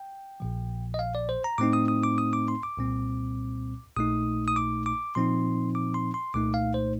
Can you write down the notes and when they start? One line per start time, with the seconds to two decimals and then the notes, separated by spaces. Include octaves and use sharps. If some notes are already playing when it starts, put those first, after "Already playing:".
Already playing: G5
0.40 A#1 A#2 F3
0.94 D#5
0.99 F5
1.15 D5
1.29 C5
1.44 A#5
1.58 A2 A3 C4 D#4 D6
1.73 D#6
1.88 D#6
2.03 D6
2.18 D#6
2.33 D6
2.48 C6
2.63 D6
2.77 C2 A#2 G3 C4
3.96 A#1 A#2 A3 D#4 D#6
4.48 D#6
4.56 D6
4.86 D6
5.15 A#2 F3 C4 D#4 C6
5.75 D6
5.94 C6
6.14 C6
6.34 C2 A#2 A3 D#4 D6
6.54 F5
6.74 C5